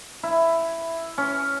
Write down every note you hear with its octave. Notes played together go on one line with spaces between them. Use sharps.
E4
C#4